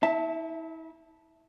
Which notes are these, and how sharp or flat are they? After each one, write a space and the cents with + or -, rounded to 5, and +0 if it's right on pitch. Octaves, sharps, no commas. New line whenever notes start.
E4 -35 E5 +0 A5 +0